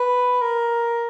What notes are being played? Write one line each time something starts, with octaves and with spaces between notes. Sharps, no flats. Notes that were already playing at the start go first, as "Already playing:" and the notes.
Already playing: B4
A#4